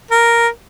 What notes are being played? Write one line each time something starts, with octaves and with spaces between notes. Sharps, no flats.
A#4